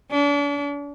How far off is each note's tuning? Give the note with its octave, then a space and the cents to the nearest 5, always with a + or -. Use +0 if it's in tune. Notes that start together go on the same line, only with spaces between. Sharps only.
D4 -40